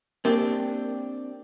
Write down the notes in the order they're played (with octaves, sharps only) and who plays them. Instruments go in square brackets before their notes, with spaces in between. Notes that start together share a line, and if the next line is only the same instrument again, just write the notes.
[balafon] A#3 A#4 [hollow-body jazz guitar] C4 D4 G4